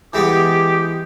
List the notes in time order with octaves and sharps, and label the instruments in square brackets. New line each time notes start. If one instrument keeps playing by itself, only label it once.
[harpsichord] E3 G#3 B3 [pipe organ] G4